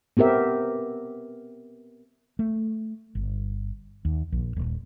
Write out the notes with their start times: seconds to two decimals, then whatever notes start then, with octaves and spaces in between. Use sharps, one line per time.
0.17 B3 C4 G4 A#4 E5
2.39 A3
3.15 G1
4.05 D#2
4.32 A#1
4.56 D#1